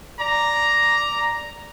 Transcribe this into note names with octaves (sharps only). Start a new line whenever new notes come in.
D5 A#5